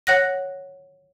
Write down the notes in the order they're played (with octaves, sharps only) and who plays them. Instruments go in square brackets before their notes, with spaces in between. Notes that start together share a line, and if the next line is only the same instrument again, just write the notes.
[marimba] C#5 F#5 F#6 A#6